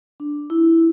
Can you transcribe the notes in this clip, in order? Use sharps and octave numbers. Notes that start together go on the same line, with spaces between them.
D4
E4